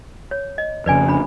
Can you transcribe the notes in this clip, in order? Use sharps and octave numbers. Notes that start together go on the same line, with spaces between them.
C#5
D#5
F2 C#3 B4 D5 G#5
D4 B5